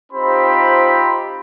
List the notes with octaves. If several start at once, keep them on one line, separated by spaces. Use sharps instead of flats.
C4 D#4 F4 G4 C5 B5